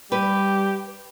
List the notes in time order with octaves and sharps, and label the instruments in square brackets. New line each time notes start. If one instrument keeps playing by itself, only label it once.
[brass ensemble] G3 [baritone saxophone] G4 [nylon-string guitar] B4